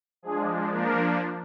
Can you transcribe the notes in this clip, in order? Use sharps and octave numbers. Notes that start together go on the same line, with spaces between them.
F3 G#3 D4 G#4
F3 A#3 D4 A#4